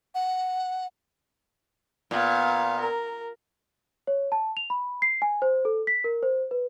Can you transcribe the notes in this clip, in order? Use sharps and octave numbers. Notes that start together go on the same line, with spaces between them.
F#5
A#2 B3 F5
A#4
C#5
A5
F7
B5
C7
G#5
C5
A4
B6
A#4
C5
B4